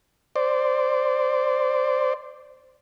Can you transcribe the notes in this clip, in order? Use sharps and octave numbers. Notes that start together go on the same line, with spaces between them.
C5 D5